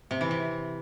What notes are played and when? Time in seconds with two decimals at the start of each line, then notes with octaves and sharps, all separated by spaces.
0.11 C3
0.21 E3
0.31 C3